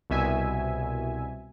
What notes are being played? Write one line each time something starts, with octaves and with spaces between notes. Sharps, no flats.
C2 B2 E5 G#5